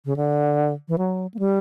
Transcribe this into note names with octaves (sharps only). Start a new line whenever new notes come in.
C#3
D3
E3
F#3
A#3
G3